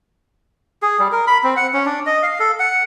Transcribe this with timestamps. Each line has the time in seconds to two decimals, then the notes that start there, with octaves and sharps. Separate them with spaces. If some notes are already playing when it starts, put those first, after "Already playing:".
0.82 G#4
0.99 G3
1.12 A#4
1.27 B5
1.44 C4
1.57 F#5
1.73 C#4
1.85 D4
2.06 D#5
2.23 F5
2.40 A4
2.59 F#5